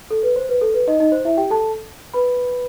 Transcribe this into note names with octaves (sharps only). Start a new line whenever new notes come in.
A4
B4
C5
B4
A4
B4
D#4 D#5
D#4 D#5
C5
E4 E5
G4 G5
A4 A5
B4 B5